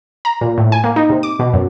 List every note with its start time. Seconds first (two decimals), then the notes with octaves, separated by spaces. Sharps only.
0.25 A#5
0.41 A#2
0.58 A2
0.72 G#5
0.84 A#3
0.96 D#4
1.10 C3
1.23 D6
1.39 B2
1.53 F#2